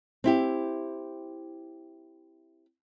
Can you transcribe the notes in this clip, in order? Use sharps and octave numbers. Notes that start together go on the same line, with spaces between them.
C4 E4 G4